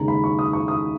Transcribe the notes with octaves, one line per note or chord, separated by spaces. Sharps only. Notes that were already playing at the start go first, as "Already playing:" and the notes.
Already playing: D#2 C#3 G#3 C#4 A#5
B5
C#6
D#6
C#6
D#6